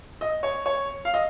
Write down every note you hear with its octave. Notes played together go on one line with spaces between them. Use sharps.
D#5
C#5
C#5
F5
D#5